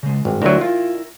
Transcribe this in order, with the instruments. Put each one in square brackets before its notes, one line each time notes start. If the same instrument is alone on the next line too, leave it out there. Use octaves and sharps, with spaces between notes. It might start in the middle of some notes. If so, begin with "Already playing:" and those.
[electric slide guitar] C#3 G#3
[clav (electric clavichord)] G#1 [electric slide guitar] G2
[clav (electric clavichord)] D2 F#3 [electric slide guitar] E4 A#4
[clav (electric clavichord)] F4